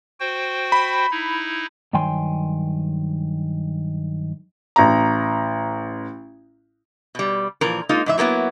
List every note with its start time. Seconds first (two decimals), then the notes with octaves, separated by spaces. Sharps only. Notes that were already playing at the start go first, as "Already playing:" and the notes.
0.20 F#4 C5 G5
0.72 B5
1.11 D#4 E4
1.93 G2 D#3 F#3 G5 G#5 C6
4.76 A1 A#5
7.15 B2 G3
7.61 A#2 E3 F3 A#4
7.89 G#3 A#3 D#4 F4
8.06 G#2 E3 E5
8.18 F#3 A#3 B3 E4